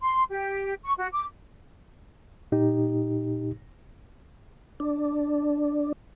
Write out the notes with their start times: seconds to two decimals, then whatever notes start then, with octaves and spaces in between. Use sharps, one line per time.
0.02 C6
0.30 G4
0.84 C#6
0.98 F#4
1.13 D6
2.52 A#2 D#4 G4
4.80 D4